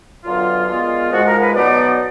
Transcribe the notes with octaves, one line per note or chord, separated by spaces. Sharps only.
F#2 D3 F#3 B3 F4
A#2 G#3 B3 F4
G#2 F3 G#3 F#4
A#4
B4
B2 F#3 B3 D#4 D5